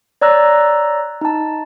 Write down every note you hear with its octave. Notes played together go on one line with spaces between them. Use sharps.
C#5 D5 A#5 E6 F#6 A#6
D#4 A5